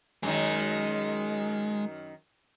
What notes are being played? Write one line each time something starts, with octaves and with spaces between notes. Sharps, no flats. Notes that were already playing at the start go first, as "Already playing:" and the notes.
F#2 D#3 G#3